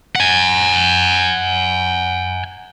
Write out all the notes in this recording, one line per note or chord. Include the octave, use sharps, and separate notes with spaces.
F#5 G#5